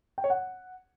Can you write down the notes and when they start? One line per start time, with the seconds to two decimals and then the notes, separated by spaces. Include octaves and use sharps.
0.18 G5
0.24 C#5
0.30 F#5